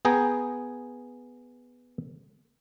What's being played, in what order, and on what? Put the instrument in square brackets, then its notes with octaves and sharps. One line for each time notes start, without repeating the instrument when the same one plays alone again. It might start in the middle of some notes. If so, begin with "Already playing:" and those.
[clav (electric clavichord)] B3 G#4 G5 A#5